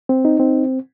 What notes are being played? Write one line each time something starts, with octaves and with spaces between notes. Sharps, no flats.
C4
D#4
C4